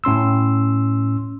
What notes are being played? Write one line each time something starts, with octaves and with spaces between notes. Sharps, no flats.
A2 C#4 C6 E6